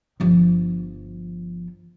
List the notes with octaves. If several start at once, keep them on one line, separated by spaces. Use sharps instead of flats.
G1 F3